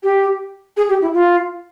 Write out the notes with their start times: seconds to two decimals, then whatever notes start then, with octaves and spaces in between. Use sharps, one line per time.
0.03 G4
0.77 G#4
0.89 G4
1.02 E4
1.14 F4